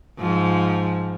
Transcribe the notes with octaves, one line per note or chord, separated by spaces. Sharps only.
G#2 F3